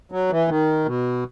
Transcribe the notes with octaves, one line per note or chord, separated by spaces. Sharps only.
F#3
E3
D#3
B2